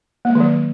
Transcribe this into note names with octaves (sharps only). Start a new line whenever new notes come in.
A#3
G#3
D#3
F#3